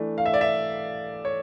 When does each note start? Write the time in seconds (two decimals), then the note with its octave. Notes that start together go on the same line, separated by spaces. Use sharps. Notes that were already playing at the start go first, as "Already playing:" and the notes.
Already playing: E3 A3 D4
0.18 F5
0.26 E5
0.33 D5
0.41 E5
1.25 C#5